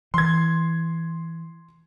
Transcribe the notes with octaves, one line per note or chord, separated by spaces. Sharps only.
E3 C6 G#6